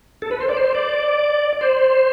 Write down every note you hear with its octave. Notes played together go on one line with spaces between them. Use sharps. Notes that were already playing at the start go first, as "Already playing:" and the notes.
A4
B4
C5
D5
C5
D5
C5